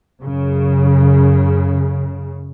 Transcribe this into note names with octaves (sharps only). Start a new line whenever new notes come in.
F#2 C#3